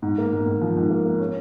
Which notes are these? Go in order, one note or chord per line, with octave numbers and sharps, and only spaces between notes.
G#2
A#3
G#2
G#2
F3
G#2
A#3
A#3
C#4